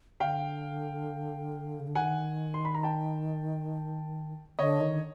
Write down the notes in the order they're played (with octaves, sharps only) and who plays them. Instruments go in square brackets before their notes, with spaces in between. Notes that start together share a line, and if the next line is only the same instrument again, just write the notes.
[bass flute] D3 [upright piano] F5 G5
[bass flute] C#3
D3
[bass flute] D#3 [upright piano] F#5 G#5
[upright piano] C6
B5
A#5
G5 A5
[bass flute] D3 [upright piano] C#5 D#5
[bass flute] D#3